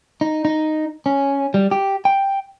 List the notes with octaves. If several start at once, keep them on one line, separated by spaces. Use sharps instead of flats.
D#4
D#4
C#4
G3
G4
G5